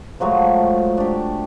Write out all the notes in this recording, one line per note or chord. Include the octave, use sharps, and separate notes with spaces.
F3 F#3 G#3 A3
D4 G4